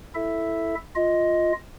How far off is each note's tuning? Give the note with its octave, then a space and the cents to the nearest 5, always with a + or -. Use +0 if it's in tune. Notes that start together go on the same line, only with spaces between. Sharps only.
E4 +0 A4 +0 E5 +0
F4 +0 D#5 +10